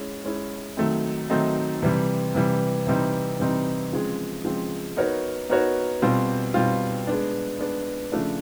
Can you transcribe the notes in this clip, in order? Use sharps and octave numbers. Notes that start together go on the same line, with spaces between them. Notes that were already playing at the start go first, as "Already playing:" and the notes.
Already playing: G#3 C#4 E4
G#3 C#4 E4
D#3 F#3 A3 C4 D#4
D#3 F#3 A3 C4 D#4
C3 E3 G3
C3 E3 G3
C3 E3 G3 C4 D#4
C3 E3 G3 C4 D#4
C#3 F3 G#3 C4
C#3 F3 G#3 C4
B3 D#4 F#4 A#4 C#5
B3 D#4 F#4 A#4 C#5
B2 G3 C4 F4
B2 G3 C4 F4
G#3 B3 D4
G#3 B3 D4
C#3 F3 A3 D4